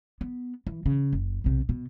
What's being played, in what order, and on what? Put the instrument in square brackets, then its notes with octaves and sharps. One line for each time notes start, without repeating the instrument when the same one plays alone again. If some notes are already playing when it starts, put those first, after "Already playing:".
[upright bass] B3
E3
C#3
F#1
B1 C3
B2